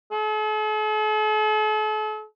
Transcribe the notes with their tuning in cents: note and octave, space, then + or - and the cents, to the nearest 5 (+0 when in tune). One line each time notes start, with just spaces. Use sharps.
A4 -45